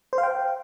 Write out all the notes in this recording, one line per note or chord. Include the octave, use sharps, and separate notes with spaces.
C5
F5
G5